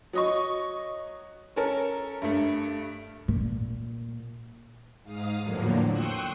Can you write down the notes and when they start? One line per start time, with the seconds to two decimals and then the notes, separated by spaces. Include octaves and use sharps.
0.13 F#3 D#5 C#6
1.56 C#4 A4 A#4
2.22 G2 A3
3.28 A#2
5.03 G#2 F5 D#6
5.41 E2 A2 D3 F3 F#3 A#3
5.89 G5 C6 C#6 D#6 E6 F#6